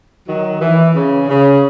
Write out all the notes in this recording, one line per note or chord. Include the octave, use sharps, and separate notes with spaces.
D#3 F#3
E3
C#3
C#3